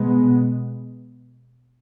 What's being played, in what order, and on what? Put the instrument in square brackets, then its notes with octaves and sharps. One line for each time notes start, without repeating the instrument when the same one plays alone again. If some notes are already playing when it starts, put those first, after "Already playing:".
Already playing: [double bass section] B2 G#3 B3